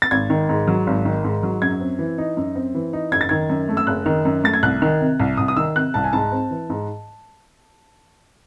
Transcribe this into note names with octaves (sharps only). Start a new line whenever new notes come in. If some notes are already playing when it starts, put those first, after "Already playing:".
A6
G#1 G#6
D#3
G#2
F#3
G#1
D#3
G#2
F#3
F#2 G#6
C4
E3
D#4
F#2
C4
E3
D#4
F#1 G#6
A6
D#3 G#6
F#2
A3
E6
F#1 F#6
D#3
F#2
A3 A6
G#6
C2 F#6
D#3
C3
C2
C2 D#6
D#6
D#3 E6
C3 F#6
C2 A5
G#5
G#2 A5
C4
E3
G#2